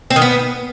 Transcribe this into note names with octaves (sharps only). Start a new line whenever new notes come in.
C4
D#3
B3